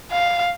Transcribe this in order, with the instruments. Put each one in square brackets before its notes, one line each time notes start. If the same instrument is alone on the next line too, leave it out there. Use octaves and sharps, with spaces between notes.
[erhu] F5